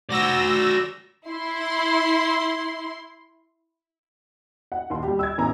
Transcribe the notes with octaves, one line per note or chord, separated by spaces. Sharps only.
F#4 D5 E6 A#6
E4 C6
F#5
D#2 C6
G3 G4
E6 G#6
A1 B3 C#4 G#5 A#5